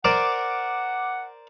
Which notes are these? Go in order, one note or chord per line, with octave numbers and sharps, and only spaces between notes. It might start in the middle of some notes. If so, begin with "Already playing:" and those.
A#4 C5 D5 F#5 D6